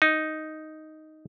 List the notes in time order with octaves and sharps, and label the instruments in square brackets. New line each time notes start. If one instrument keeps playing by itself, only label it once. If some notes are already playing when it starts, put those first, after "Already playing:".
[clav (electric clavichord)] D#4